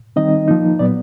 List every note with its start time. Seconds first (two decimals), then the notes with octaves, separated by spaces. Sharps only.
0.16 D#3 G3 C4 D#4 D#5
0.48 F3 A#3 D#4
0.79 A#2 F#3 B3 D5